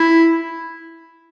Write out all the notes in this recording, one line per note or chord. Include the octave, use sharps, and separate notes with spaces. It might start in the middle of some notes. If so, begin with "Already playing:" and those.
Already playing: E4